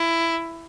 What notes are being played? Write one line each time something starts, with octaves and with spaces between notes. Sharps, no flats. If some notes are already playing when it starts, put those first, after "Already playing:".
Already playing: E4